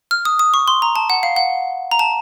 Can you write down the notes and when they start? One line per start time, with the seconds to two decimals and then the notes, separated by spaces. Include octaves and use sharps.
0.11 F6
0.25 D#6
0.39 D#6
0.54 C#6
0.68 C6
0.82 A#5
0.96 A5
1.10 F#5
1.23 F5
1.36 F#5
1.91 A#5
1.99 A5